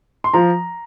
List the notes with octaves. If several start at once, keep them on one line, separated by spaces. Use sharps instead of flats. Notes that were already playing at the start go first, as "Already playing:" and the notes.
C6
F3 A#5